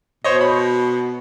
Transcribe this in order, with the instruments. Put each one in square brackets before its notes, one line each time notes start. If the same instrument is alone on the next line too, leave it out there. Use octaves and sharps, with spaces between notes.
[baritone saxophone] B2 [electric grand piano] C5 C#5 D#5
[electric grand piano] B5